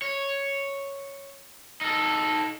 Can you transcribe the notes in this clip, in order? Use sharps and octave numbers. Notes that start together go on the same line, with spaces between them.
C#5
D#4 A4